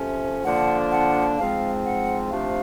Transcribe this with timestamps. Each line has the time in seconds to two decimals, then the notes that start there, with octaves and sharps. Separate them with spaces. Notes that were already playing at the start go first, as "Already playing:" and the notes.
Already playing: C3 F3 A3 C#4
0.45 D3 F3 A#3 D4 F#5
0.92 F#5
1.39 G#2 F3 G#3 C4 F5
1.86 F#5
2.32 C3 F3 A3 D4 F5